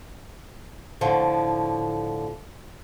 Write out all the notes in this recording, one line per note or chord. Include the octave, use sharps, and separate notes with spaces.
A2 D3 F3